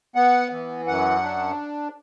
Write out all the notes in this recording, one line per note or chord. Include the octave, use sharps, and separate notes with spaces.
B3 F#5
E3
F#2 F#5
D4